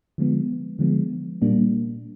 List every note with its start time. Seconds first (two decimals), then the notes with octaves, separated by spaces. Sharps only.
0.18 D3 F3 G#3 B3
0.79 D3 F3 G#3 B3
1.42 A#2 G3 A#3 D4